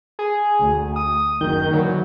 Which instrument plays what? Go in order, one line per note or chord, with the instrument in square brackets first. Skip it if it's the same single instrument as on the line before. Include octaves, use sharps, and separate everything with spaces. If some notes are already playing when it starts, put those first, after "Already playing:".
[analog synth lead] G#4
[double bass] D2
[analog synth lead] D#6
[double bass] F#1 [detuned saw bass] D#3 [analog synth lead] G6
[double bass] D3 E3 [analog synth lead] F#3